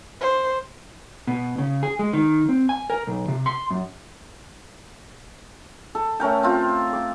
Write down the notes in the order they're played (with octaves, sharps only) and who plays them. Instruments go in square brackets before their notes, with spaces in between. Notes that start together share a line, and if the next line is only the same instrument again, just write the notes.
[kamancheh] C5
[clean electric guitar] B2
C#3
G#4
G#3
D#3
C4
G#5
A#4
B1
C3
C6
F#2
[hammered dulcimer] A4
A3 C#4 A#4 G5
C4 F4
D6